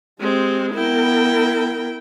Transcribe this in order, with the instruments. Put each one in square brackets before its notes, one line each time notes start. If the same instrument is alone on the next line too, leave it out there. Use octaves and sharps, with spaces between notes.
[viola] G#3 C4 [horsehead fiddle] G4
[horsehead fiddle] B3 A#4 [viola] E4 G5